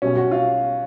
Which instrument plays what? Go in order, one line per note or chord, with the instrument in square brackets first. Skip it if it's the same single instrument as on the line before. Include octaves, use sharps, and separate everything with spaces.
[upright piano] B1 B2 G3 C#4
F#4
F4